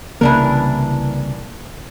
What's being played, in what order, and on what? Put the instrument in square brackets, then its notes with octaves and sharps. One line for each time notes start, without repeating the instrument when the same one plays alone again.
[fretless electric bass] C2 C#3 A#3 [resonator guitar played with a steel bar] E3 D4 A#4